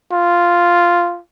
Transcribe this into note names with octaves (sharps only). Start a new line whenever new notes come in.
F4